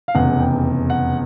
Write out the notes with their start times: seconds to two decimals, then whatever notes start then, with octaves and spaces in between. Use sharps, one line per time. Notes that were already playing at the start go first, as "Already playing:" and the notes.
0.08 F5
0.15 F1 E2 C#3 F#5
0.40 G5
0.90 F#5